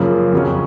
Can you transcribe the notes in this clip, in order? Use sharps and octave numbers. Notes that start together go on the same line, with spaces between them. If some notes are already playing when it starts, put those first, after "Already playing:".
Already playing: F#2 C#3 F3 A#3
F2 C#3 F#3 C#4